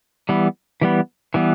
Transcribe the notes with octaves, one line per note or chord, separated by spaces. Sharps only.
E3 G3 B3
E3 G3 B3
E3 G3 B3